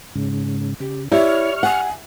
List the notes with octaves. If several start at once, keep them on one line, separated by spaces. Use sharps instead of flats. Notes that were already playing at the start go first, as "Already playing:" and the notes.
G#2 C#3
C#3 G4
E4 G4 C#5 D5 E5 C#6 F6
F#5 G#5